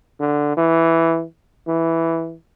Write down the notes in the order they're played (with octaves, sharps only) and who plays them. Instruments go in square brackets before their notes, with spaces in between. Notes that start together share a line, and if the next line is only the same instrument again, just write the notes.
[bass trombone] D3
E3
E3